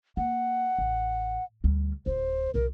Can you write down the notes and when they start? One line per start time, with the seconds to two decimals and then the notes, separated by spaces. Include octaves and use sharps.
0.17 A#3 F#5
0.78 A1
1.64 D2 G3
2.06 D1 F4 C5
2.54 B1 D#3 A#4